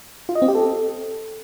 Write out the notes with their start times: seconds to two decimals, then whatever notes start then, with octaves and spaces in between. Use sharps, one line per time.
0.29 F4
0.35 D#5
0.42 C4
0.48 G4
0.55 A4